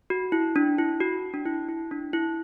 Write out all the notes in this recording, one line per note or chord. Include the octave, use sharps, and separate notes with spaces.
F#4
E4
D4
E4
F#4
D4
E4
E4
D4
E4